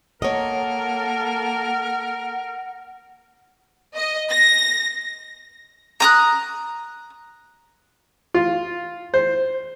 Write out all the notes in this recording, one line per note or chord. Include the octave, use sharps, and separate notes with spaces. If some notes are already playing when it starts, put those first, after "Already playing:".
A#3 A4 A#4 C#5 D#5 F#5
D#5
A#6
A#5 D#6 F#6
F4
C5